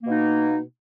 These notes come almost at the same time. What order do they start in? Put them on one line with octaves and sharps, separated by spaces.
A#3 B2 D#4